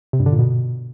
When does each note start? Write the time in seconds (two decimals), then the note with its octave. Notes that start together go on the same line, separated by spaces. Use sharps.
0.13 C3
0.20 G2
0.26 D3
0.32 A#2
0.39 B2